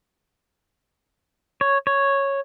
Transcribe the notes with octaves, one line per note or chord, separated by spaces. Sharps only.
C#5
C#5